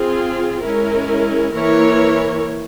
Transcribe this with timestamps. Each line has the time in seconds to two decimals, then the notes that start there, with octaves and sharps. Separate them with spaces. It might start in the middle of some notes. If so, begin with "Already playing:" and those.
Already playing: C4 F4 G#4
0.62 G#3 C#4 E4 A#4
1.52 E3 A#3 E4 A#4 C#5